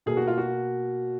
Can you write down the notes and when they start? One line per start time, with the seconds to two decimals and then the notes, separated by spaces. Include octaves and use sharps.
0.06 B2 A#3 G#4
0.17 F#4
0.27 F4
0.38 F#4